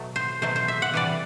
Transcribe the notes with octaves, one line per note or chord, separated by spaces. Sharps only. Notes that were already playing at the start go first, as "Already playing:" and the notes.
Already playing: B2 F#3 A3
C5
B2 F#3 A3 C5
C5
E5
F#5
C3 E3 G3 D5